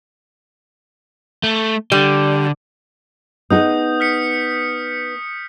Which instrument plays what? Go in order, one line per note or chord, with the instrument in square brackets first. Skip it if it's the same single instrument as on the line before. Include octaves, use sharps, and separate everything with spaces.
[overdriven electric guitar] A3
[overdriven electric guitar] D3 [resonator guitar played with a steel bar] G3
[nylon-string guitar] B3 D#4 G#4 [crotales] D#6 G6
[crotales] F6 B6 C#7